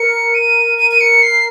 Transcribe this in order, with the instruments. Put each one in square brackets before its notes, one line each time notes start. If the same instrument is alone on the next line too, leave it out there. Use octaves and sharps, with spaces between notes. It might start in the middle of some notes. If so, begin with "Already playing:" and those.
Already playing: [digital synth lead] A#4 [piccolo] C#7
[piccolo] D#7
D#7
D#7
C#7
C7